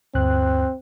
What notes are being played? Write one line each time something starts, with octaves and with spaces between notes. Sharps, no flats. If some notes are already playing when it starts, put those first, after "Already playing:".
D2 G2 C4 F#6